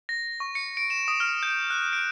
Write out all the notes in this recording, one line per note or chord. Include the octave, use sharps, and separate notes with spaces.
A#6
C#6
C#7
D7
E7
D#6
F6
G6
F#6
D7